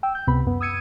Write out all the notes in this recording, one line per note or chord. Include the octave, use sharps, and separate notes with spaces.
G5 E6
G6
C#2 C3 B3 B5
F#2 B3
D#6 E6 G#6 C#7 D#7